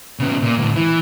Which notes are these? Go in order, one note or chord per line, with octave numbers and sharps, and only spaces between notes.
C#3 B3
A#2
D2 A2
E3